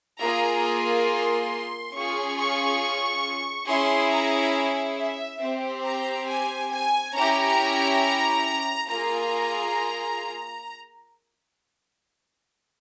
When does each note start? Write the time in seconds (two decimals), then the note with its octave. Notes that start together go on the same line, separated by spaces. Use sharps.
0.19 A#3 F4 G#4 A#5
1.07 C6
1.94 C#4 F4 G#4 C#6
2.38 C#6
3.67 C#4 E4 G#4 C6
4.12 A#5
4.98 E5
5.42 C4 G4
5.86 A#5
6.29 G#5
6.72 G#5
7.15 C#4 E4 G4 A#5
8.89 A#3 F4 G#4 A#5